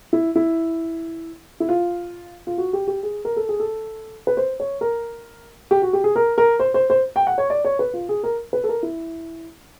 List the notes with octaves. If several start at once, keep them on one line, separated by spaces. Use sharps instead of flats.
E4
E4
E4
F4
F4
F#4
G4
G4
G#4
A#4
A4
G#4
A4
B4
C5
C#5
A#4
G4
F#4
G4
G#4
A#4
A#4
C5
C5
C5
G5
F#5
C#5
D5
C#5
B4
F4
G#4
A#4
B4
A4
A#4
E4